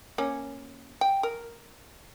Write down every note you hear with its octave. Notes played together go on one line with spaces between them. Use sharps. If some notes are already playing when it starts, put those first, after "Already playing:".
A#3 C#4
G5
A#4